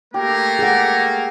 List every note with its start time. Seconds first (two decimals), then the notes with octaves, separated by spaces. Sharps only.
0.14 A3 A#3 G4 A#4
0.59 G#4 F#5